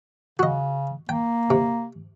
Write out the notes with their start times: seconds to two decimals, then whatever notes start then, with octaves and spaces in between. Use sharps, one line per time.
0.39 C#3 F#4 D#5
1.09 A#3 G5
1.50 C3